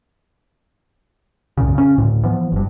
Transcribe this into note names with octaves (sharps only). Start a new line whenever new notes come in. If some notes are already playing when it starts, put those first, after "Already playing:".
C2 F#2 A#2 C#3
C#3 C#4
D2 A2
E3 F3 B3
F#1 G2